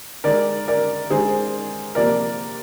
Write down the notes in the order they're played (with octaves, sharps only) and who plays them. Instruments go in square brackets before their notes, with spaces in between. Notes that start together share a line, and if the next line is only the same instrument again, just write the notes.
[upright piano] D#3 G#3 A#4 D5
A#4 D5
D#3 G#3 G#4 C5
C3 F3 A#3 A#4 D5